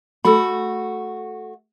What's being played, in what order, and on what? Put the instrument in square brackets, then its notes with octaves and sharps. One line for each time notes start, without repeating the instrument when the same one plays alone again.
[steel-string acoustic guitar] A3 F#4 [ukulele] A4 B5